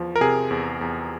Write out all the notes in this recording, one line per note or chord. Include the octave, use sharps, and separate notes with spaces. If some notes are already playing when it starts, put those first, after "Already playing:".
Already playing: E2 F3
A#4
C3 G#4
E2
E2